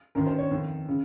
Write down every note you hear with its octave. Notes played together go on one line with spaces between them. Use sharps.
F#2 D#3 A#4
C5
C#5
F2 D#3
C#3